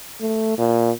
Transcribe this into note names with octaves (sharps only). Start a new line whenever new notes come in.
A3
A#2